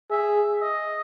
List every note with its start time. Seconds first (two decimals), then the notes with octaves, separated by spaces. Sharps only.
0.10 G#4 E5
0.62 D#5